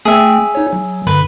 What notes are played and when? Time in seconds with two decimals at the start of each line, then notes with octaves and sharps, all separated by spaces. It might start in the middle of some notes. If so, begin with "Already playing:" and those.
0.05 A3 G#4 E5 G5
0.55 D#4 C#5
0.73 F#3
1.07 G2 D3 B4